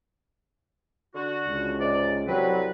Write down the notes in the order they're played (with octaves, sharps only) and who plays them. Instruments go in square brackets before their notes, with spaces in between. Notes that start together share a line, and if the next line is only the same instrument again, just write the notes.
[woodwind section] D3 F#4
[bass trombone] C#2
[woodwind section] G#2 C3 D5
[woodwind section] C2 C4 B4 [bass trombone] F#3